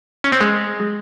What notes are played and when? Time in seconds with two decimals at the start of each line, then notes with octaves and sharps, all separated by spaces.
0.24 C#4
0.32 C4
0.41 G#3